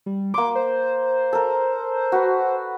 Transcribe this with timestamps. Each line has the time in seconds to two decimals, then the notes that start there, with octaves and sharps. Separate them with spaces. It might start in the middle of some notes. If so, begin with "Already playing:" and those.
0.06 G3
0.34 A#3 C6 D6
0.55 C5
1.33 A4 A#4
2.12 F#4 B4